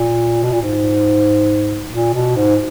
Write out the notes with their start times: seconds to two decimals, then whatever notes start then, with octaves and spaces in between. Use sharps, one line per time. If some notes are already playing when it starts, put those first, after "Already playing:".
Already playing: A#2
0.43 B2
0.52 A#2
0.62 G#2
1.92 A#2
2.14 B2
2.36 G#2